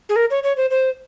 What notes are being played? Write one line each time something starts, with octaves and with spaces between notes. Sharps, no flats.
G#4
A#4
C#5
C#5
C5
C5